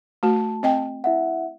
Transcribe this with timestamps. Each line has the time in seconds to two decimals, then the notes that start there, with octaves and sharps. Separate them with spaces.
0.23 A3 F#4 A5
0.63 C4 D#5 G5
1.04 E4 E5 F#5